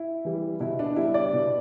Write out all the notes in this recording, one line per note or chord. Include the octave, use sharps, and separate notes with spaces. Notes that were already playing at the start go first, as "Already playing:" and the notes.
Already playing: E4
E3 G3
B2 E4
D4
G3 E4
D5
B2